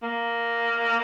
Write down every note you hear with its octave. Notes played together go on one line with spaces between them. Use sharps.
A#3